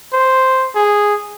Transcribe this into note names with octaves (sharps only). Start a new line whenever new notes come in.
C5
G#4